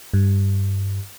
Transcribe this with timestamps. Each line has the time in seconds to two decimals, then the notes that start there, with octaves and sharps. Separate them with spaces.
0.14 G2